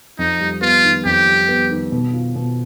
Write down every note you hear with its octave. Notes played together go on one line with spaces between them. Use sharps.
F2 D#4
G3
B3 F4
D#3
F2 G4
G3
B3
D#3
B2
F4
B2